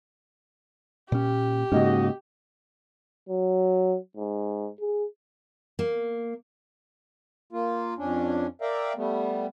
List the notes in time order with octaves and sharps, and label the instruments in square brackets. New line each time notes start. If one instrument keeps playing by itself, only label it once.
[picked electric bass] A#2 C#4 [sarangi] G4
[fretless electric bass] G#2 [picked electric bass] C#3 A#3 C#4 [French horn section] F#4 D#5
[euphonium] F#3
G#2
G#4
[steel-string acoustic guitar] A#3
[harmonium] A#3 F4
F2 C#4 D4
A#4 D5 E5 F5 G5 A#5
G3 A3 B3